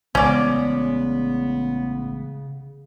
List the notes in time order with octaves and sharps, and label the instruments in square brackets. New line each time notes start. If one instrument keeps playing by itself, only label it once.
[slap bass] A1 G#3 [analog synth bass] C#3 [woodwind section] B3 [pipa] C#4 D5